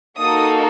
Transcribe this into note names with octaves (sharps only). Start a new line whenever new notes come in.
A#3 D#4 F#4 A4 D#6